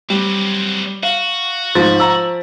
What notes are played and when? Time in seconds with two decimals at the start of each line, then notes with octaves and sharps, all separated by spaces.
0.10 F#3 G3 C4
1.03 F#4 F5
1.75 G#2 F3 A6
2.00 A#5 E6